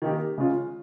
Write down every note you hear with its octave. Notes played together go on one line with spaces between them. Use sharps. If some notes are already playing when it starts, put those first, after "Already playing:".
D#3 A#3 D#4 G4
C#3 G#3 C#4 F4